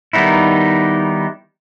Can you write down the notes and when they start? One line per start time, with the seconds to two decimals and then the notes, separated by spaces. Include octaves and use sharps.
0.13 D#3 G3 B3 D#4 E4